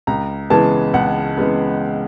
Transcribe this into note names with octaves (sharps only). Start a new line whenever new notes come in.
C#2 A#5
C#3 E3 G#3 B3 A5
C#2 F#5
C#3 E3 G#3 B3